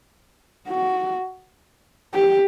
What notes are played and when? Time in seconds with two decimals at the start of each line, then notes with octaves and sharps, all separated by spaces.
0.68 F#4
2.14 G4